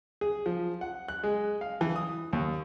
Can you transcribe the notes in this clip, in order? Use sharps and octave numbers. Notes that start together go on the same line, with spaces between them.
G#4
F3
F#5
F#6
G#3
F5
E3
D#6
D#2